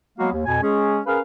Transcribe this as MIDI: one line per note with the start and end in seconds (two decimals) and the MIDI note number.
0.18 0.31 54
0.18 0.31 56
0.18 0.31 58
0.18 0.31 59
0.18 0.31 66
0.18 0.31 77
0.32 0.41 39
0.46 0.61 41
0.46 0.61 47
0.46 0.61 80
0.63 1.00 56
0.63 1.00 61
0.63 1.00 68
1.06 1.19 61
1.06 1.19 68
1.06 1.19 70
1.06 1.19 71
1.06 1.19 77